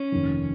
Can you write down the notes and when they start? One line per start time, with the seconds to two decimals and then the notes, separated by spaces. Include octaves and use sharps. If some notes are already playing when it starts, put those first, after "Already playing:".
Already playing: C#4
0.12 F1 D#2 D#3